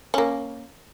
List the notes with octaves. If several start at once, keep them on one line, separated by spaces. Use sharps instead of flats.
A#3 C#4